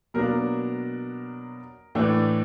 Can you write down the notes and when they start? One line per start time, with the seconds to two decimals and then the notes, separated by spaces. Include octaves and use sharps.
0.14 B2 F#3 A#3 D4 A#4
1.95 A2 E3 A3 D4